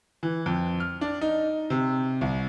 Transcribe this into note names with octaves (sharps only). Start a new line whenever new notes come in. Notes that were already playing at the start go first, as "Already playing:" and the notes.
E3
F2
F6
D4
D#4
C3
C2